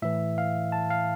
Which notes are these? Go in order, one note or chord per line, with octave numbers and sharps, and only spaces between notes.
A2 E3 E5
F5
A5
F5